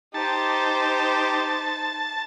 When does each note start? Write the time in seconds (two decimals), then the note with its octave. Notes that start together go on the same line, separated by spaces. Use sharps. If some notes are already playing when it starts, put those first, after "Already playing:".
0.14 D#4 G4 C5 A5